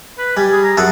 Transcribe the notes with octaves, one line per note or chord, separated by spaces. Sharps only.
B4
G3 G#5
G#4
A#5
F#2 G#4 A4 F#5